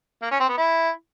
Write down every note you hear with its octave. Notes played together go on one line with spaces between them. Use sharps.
A#3
C#4
C4
B3
E4